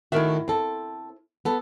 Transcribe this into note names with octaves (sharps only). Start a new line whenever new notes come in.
A2 D#3 E4 F#4 A#4 E5
C4 A4
B3 A4